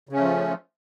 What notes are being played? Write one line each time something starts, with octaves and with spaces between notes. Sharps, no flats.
C#3 F3 A3 C#4